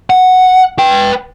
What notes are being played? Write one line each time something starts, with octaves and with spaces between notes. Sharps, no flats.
F#5
B4 G5